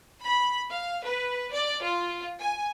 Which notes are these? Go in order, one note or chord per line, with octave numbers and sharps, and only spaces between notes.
B5
F5
B4
D5
F4
G#5